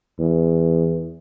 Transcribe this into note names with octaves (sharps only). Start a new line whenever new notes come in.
E2